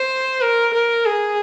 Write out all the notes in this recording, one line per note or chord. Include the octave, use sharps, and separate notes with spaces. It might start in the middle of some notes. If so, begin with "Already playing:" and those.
Already playing: C5
A#4
A#4
G#4